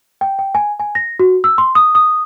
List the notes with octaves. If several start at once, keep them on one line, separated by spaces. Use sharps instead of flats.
G5
G5
G#5
G#5
A#6
F#4
E6
C6
D#6
D#6